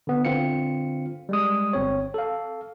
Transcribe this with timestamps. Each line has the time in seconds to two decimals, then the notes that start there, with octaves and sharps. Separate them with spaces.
0.07 D3 B3
0.25 D3 C4 F4 F5 C#7
1.29 G3 G#3 D#6
1.73 G1 C4 C#5
2.14 A4 F5